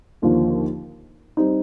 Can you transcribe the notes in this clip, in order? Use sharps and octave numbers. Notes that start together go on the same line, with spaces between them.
D#2 D3 F3 A#3 F4
G3 C4 D#4